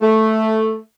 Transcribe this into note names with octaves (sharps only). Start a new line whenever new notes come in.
A3